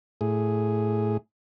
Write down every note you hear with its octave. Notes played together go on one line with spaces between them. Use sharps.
A2 G#4